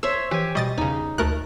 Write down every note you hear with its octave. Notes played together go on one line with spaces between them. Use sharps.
C5 C#5 E5 E6
E3 G4 G#5
B2 G3 D#5 A6
E2 C#3 D#4
D2 A3 A#4 F#6